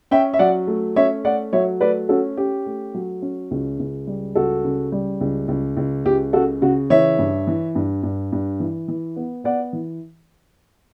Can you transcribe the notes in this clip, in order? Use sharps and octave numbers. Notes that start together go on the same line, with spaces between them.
C#4 E5 G5
E5
F#3 D5 F#5
A3
C#4 C#5 E5
A3 D5 F#5
F#3 C#5 E5
A3 B4 D5
C#4 F#4 A4
C#4 G4
A3
F#3
C#4
C#2
C#2
G3
C#2 F#4 A4
C#3
G3
C#2
C#2
C#2
C#2 G4
C#3 F#4 A4
C#3 F#4
E3 C#5 E5
G2
E3
G2
G2
G2
E3
E3
B3
B3 D5 F#5
E3